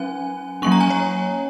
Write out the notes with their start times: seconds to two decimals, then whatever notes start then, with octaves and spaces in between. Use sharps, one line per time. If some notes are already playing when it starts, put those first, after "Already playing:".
Already playing: F#3 C#4 G#5
0.62 F#3 A#3 C#4 C#6
0.72 A#5
0.81 G#5
0.90 C#5